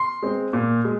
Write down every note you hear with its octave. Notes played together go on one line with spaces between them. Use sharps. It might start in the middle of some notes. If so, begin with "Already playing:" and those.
Already playing: C6
G#3 C4
A#2
G#3